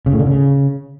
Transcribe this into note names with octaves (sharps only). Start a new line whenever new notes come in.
C#3
A2
D3
C#3